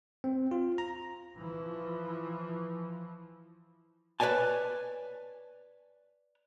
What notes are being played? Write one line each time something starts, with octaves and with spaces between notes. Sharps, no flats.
C4
F4
A#5
E3 F3
B4 C#5 D5 G#5 A5